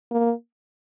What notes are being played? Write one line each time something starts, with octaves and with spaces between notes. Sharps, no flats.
A#3